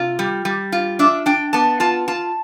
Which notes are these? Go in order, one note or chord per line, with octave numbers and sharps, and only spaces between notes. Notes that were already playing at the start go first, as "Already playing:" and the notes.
Already playing: C3 F4
G3
G3
F4
D4 E5
D4 G5
B3 A5
F4 A5
F4 A5